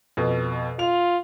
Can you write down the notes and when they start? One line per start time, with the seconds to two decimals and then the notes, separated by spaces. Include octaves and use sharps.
0.17 F2 B2
0.79 F4 F7